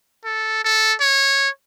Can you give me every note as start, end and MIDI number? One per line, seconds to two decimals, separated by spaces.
0.25 0.63 69
0.64 0.93 69
1.01 1.49 73